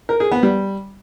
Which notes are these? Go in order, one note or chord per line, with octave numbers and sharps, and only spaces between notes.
A#4
G#4
B3
G3